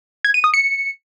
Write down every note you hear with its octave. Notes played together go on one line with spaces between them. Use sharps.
G#6
D#7
D#6
C#7